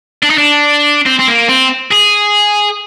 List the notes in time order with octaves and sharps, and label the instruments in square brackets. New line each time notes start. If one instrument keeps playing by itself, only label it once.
[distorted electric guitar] D4
D#4
D4
C4
C4
A#3
C4
G#4